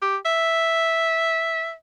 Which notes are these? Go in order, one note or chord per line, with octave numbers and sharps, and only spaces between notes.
G4
E5